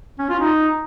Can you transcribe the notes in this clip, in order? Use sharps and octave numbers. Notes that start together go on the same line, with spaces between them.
C#4
F4
D#4